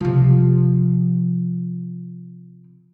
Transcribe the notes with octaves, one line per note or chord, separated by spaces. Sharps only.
C3 F3